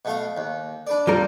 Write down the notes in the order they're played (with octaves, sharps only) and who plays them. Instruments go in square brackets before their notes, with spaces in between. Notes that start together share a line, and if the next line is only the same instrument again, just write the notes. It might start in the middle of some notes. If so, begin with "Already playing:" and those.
[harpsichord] B2 A3 F5
D#2
D4 B4 D5
[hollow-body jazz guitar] F2 G3 A#4